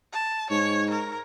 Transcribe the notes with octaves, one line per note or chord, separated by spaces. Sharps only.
A5
G#2 C#5
A#4